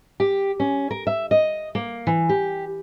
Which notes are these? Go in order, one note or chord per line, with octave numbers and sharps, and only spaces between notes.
G4
C#4
A#4
E5
D#5
A#3
E3
G4